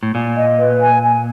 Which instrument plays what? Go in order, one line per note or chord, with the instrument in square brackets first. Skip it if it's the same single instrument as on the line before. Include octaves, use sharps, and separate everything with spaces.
[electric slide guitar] A2
[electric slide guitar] A#2 [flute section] G#5
[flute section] D#5
B4
G#5
G#5